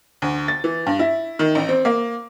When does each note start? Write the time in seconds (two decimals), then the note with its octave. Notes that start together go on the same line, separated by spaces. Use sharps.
0.22 D2
0.48 A6
0.64 E3
0.86 G2
0.99 E4
1.39 D#3
1.55 A1
1.69 C4
1.85 A#3